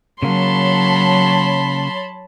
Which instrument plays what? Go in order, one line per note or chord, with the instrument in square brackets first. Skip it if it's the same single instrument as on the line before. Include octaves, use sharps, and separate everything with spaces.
[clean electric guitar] C#3 A#3 [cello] F#3 [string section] C#5 A5 B5 [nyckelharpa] C6